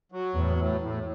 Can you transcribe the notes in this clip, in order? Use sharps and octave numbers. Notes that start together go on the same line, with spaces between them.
F#3
E2 A2
A2
A2